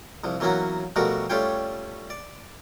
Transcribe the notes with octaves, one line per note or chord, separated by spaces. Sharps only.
C2 F3
E3 F#3 A#3 B3 C#4 F#4
B2 F3 G3 A3 F#4 A#4
G3 A3 C#4 F4 C#5 G5
D5